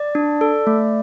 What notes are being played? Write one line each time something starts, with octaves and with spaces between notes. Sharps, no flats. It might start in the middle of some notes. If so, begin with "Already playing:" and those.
Already playing: D5
D4
A4
A3